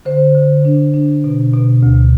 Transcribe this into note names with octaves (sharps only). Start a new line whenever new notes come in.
D3 C5
D3
D4
D4
B2
B2
D2